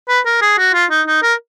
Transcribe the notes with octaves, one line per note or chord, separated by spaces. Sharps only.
B4
A#4
G#4
F#4
F4
D#4
D#4
A#4